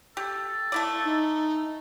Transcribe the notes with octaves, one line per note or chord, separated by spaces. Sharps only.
G4 A4
A3 E4 D5
D#4